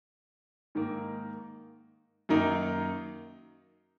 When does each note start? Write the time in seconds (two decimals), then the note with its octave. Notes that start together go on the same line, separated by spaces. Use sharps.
0.75 G#2 D#3 A#3
2.29 F#2 D#3 A#3 D#4